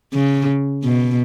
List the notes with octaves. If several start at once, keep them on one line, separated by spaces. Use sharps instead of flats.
C#3
B2